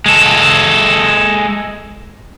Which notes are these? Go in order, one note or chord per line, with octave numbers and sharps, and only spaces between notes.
G#3 A4